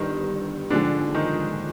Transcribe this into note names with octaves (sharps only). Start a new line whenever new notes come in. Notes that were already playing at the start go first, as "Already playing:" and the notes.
Already playing: G1 G2 D3 D#3 G3 D#4
A#1 G#2 D3 F3 G#3 D4
D#3 D#4